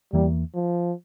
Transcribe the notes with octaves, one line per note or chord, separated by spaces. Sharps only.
E2 E3 G3 A#3
F3